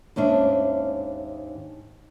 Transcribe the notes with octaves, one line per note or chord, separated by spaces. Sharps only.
D#2 G#2 C#4 D4 E5